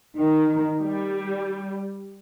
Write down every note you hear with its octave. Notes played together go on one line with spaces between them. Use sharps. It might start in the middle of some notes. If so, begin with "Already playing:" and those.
D#3
G3